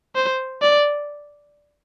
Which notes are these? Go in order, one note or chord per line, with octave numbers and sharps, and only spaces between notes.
C5
D5